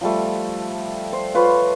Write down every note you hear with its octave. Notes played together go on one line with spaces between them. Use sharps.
F3 G3 A3
C5
F4 B4 C#5